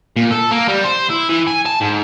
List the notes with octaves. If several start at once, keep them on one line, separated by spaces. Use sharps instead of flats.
A#2
A4
A#3
G3
C5
E4
E3
G#5
A5
G#2